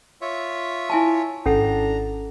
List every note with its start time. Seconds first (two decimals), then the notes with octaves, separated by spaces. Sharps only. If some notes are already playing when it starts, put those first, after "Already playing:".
0.21 F4 C#5 E5
0.90 E4 G#5 A5
1.46 G#1 C#4 D4 A4 F#5 A#5